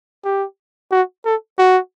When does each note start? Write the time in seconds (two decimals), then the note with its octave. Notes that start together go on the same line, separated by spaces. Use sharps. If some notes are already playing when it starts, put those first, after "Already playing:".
0.24 G4
0.91 F#4
1.25 A4
1.58 F#4